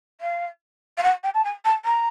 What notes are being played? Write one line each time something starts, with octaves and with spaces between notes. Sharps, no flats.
F5
F5
F#5
G5
A5
G#5
A5
A#5